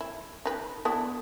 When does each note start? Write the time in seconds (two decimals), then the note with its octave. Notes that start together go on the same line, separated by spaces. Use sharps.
0.01 E4
0.45 D#4 B4
0.85 B3 D4 E4